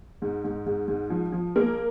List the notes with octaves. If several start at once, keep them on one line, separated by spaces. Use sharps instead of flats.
G#2
G#2
G#2
G#2
F3
F3
G#3 A#3 A#4